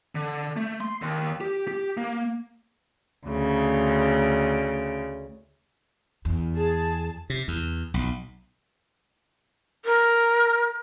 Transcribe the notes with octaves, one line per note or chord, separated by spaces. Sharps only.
D3
A3
C6
D#2
G4
G4
A#3
D2 C#3
E2
G#4 A5
C3
E2
B1
A#4